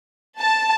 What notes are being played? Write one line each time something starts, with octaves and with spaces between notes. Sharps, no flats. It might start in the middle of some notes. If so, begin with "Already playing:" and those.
A5